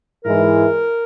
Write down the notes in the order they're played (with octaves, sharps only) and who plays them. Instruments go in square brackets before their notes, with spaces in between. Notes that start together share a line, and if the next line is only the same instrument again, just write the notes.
[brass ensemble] G#2 E3 G#3 E4 [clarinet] A#4